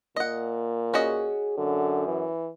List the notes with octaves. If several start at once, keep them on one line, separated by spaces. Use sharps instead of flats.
A#2 D#5 F#5
C#4 F#4 G#4 D#5
F#2 D3
E3